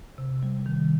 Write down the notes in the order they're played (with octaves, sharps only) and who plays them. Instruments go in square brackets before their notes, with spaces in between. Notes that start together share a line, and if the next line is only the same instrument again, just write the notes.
[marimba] C3
G3
D#3